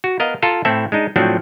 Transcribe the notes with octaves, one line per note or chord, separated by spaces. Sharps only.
F#4
B3 A#4 D#5 F5
F4 A4 A#5
A2 C4 E4 A4 E5
G#3 D4 D#4
A2 F3 F#3 C4 D4